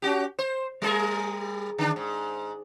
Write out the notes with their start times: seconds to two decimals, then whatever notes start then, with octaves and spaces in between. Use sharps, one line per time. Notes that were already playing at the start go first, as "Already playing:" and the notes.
0.02 C#4 F#4 G4
0.39 C5
0.82 G3 G#4 A#4
1.78 D3 D4
1.96 G#2